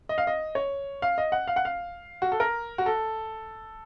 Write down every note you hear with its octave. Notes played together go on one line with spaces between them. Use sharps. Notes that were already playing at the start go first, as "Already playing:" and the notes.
D#5
F5
D#5
C#5
F5
D#5
F#5
F5
F#5
F5
F#4
A4
A#4
F#4
A4